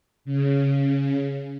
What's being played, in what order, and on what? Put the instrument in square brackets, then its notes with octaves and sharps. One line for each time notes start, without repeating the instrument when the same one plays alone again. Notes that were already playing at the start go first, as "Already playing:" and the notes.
[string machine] C#3